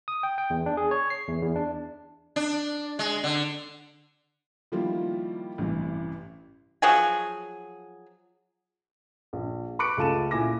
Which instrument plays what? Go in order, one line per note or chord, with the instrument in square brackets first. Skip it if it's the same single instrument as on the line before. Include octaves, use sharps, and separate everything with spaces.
[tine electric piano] D#6
G5
G5
E2
D4
G#4
C#5
C7
E2
E2
D4
[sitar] D4
G#3
D3
[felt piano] D#3 F3 G3 A#3 E4 F4
A1 G2 C3 E3
[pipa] F3 F#3 G#4
[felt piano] A#1
B5 C#6 D6 F#6 C#7 D7
C#2 A3 F4 A5 D#7 E7
A#2 E4 G#5 D6 A#6